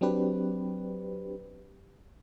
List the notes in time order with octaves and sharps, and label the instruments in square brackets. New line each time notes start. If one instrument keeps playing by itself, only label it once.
[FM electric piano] F#3 C4 D4 G4 B4